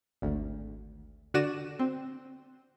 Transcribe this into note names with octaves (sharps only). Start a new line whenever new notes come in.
G#1 D2
D3 F#4 D5 A#6 D#7 E7
C4